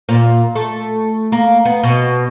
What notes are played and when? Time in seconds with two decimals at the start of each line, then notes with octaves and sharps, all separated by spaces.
0.09 A#2
0.55 A3
1.32 A#3
1.65 B3
1.83 B2